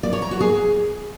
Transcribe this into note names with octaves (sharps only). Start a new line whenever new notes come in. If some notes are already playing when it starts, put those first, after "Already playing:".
D5
C#5
A#5
F#4
G#4